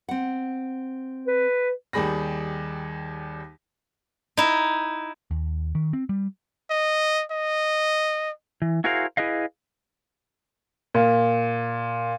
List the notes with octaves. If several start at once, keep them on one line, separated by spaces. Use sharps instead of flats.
C4 F#5
B4
D#2 D#3 G3 G#4 B5 A#6
D#4 E4
D#2
D#3
C4
G3
D#5
D#5
E3
E4 F#4 G#4 A#4 C5 F5
E4 G#4 B4 D#5 F5
A#2